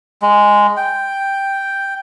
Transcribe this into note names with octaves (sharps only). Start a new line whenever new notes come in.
G#3
G5